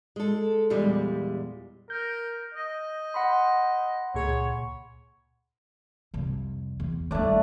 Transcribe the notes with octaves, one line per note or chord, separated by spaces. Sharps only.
G#3 A4
E2 A#2 G3 G#3
A#4 G6
D#5
F#5 B5 C6
C#2 A#2 G#4 C#5
C2 F2
E2
D#2 G3 A3 D4 D5